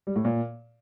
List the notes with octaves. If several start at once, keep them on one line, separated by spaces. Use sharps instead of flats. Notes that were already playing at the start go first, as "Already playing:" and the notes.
G3
A2
A#2